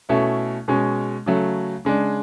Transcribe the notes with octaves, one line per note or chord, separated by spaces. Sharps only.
B2 A3 C#4 E4
B2 G#3 C#4
C#3 F#3 A3
C#3 G#3 D4